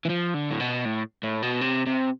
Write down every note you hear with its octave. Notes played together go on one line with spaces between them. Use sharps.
E3
F3
D3
A2
B2
A2
A2
B2
C3
C3